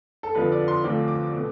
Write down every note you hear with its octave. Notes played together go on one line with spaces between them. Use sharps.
A4
F2 D3 F3 B4
D5
C6
D2 D3 F3 C4 F4 D6
D6
B2 A3 C4